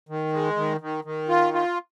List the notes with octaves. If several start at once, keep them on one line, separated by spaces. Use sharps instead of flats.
D#3
G#3
D#3
D#3
D#3
F4
F4